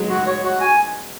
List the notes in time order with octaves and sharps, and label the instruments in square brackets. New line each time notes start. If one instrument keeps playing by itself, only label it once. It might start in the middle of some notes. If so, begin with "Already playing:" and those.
Already playing: [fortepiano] F#3 G#3
[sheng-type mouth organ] F#4
C#5
F#4
G#5